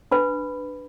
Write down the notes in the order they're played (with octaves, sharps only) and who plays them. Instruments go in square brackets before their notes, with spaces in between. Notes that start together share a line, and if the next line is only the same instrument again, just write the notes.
[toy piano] D4 B4 B5